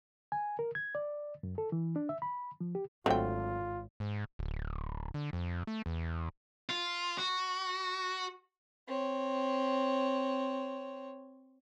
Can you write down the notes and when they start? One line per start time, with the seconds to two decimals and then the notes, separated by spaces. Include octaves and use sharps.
0.32 G#5
0.59 A#4
0.75 G#6
0.95 D5
1.43 F#2
1.58 A4
1.72 E3
1.96 D4
2.09 E5
2.22 B5
2.61 F3
2.75 G4
3.06 G#1 D3 F#3 A3 C4 F4 G5
4.00 G#2
4.39 D1
5.14 D3
5.33 F2
5.67 A3
5.86 E2
6.69 F4
7.18 F#4
8.88 C4 C#5